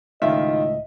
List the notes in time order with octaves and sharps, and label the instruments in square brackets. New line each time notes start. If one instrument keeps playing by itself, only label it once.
[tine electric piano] C#2 A2 [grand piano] D#3 F4 [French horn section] D#5 [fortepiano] E5